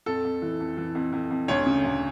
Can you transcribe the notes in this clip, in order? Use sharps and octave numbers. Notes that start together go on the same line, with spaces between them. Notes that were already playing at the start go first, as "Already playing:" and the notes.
F2 A4
F2
E3
F2
E3
F2
F2
F2
D2 C#5
C#3
D2